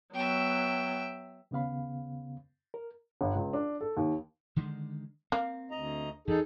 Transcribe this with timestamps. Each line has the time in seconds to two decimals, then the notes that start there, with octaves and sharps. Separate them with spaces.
0.14 F#3 B3 E5 G5
1.51 D#2 C#3 B3 F5 B5
2.74 A#4
3.21 G1
3.35 C#2
3.53 D4
3.81 A4
3.97 D#2
4.56 D3 D#3 G#3
5.32 A#3 C4
5.71 D2 D#5 A#5
6.27 E2 D#4 G#4 A4